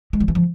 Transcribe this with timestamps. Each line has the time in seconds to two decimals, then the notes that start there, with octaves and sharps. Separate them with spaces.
0.13 G#3
0.20 F3
0.28 E3
0.35 F3